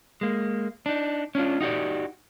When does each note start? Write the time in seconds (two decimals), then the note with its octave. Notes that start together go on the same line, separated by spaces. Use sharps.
0.21 G#3 A#3
0.86 D4 D#4
1.35 C#4 D4 E4 F4
1.61 D#4 F#4 G4 D5